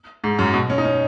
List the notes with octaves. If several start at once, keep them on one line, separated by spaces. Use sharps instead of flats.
G#2
F#2
B2
C#4
D#4
C#4